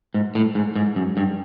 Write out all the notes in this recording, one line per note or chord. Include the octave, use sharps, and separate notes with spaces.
G#2
A2
G#2
G#2
F#2
G2